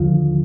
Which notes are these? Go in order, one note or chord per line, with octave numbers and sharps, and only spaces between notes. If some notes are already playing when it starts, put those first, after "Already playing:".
Already playing: D#2 D3 F3